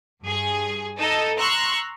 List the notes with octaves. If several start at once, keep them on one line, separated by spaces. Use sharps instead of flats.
G2 G#4
D#4 A4 D#5
A#5 C6 C#6 E6 F#6